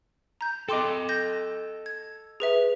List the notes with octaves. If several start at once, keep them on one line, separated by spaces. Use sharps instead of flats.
A#5 G6
A4 D#5 G5 C6 D6
G6 A#6
G#6
G#4 B4 E5